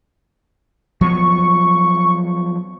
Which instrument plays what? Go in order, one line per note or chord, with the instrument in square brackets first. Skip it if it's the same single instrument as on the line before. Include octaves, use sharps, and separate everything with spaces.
[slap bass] F3 F#3 B3 [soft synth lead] C#6